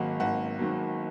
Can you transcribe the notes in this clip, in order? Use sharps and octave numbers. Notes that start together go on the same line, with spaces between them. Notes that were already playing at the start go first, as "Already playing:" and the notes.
Already playing: G#1 G#2 D#3 F#3 A#3 F#5
G#1 F#5
G#2 D#3 F#3 A#3